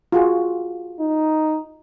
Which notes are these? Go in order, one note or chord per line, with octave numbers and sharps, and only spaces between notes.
F4 F#4 G#4
D#4